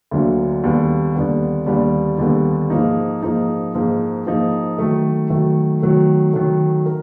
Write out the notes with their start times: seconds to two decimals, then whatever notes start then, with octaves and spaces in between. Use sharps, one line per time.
0.11 D2 D3 F#3 A#3
0.64 D#2 D3 G3 B3
1.15 D#2 D3 G3 B3
1.66 D#2 D3 G3 B3
2.18 D#2 D3 G3 B3
2.70 G#2 F3 A#3 D#4
3.23 G#2 F3 A#3 D#4
3.75 G#2 F3 A#3 D#4
4.26 G#2 F3 A#3 D#4
4.78 D#3 F#3 A3
5.30 D#3 F#3 A3
5.82 D#3 F#3 A3
6.34 D#3 F#3 A3
6.86 A#4